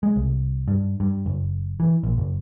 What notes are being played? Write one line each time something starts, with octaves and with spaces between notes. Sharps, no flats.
G#3
C2
G2
G2
F#1
E3
A#1
F#1